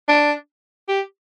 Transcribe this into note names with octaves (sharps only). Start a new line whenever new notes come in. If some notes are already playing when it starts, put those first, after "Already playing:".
D4
G4